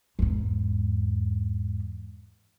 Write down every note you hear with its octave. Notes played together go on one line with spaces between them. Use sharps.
E2 G#2